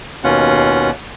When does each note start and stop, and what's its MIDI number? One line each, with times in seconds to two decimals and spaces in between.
0.24 0.91 39
0.24 0.91 47
0.24 0.91 61
0.24 0.91 65
0.24 0.91 78